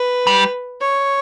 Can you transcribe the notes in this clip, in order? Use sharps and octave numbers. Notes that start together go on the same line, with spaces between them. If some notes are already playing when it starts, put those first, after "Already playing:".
Already playing: B4
G3
C#5